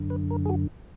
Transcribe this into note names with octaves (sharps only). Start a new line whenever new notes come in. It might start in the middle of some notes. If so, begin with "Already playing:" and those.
Already playing: F#2 D3
B4
A#4
G#4
F#4